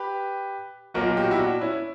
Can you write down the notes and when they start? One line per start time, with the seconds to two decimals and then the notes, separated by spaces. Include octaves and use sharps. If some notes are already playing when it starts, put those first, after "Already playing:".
Already playing: G4 B4
0.94 B1 A#2 F#3 A#3 F#4 A#4
1.17 G4
1.24 F#4
1.31 E4 G4
1.39 D4 F#4
1.61 C#4 E4